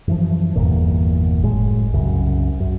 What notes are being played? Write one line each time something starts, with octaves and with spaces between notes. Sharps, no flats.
F#2 E3 F3
G1 E2 A#2
F#1 A2 G#3
C2 F#2 C#3
F#2